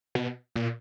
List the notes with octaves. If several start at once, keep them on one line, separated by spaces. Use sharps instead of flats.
B2
A#2